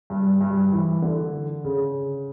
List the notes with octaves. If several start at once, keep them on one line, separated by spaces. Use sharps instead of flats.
G2
G2
E3
D3
C#3